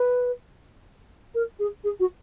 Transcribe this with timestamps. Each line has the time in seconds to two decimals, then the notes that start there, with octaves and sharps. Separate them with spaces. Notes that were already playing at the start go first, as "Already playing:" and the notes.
Already playing: B4
1.34 A#4
1.59 G#4
1.84 G#4
1.99 F#4